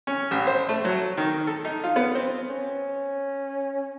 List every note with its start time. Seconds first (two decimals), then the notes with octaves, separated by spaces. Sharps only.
0.07 C#4
0.31 A1
0.47 C5
0.69 A3
0.85 F#3
1.17 D#3
1.47 A4
1.65 D#4
1.84 F4
1.96 B3
2.15 C4
2.50 C#4